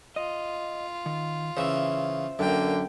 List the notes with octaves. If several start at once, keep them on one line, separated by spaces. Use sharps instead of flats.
F4 D#5
D#3
C#3 E3 C5 E5
F#2 D3 A#3 G5